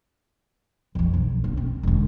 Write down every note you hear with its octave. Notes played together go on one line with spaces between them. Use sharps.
F2 F3
B1
D2
C4
E1 D2